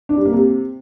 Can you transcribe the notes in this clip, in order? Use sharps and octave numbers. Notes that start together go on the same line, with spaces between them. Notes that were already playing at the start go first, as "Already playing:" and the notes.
D4
G3
A#3
C3